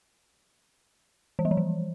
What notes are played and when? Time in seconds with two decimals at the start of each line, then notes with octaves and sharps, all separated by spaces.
1.39 E3
1.45 G3
1.51 F3
1.57 E3